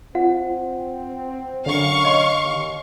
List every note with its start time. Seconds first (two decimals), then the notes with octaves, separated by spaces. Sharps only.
0.15 C4 F4 F#5
1.66 F#2 D3 F5 C#6
2.03 C#5 D#5 C6
2.44 D#2